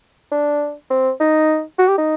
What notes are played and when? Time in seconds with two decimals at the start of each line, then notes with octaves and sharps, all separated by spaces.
0.32 D4
0.90 C4
1.20 D#4
1.78 F#4
1.88 G4
1.98 D#4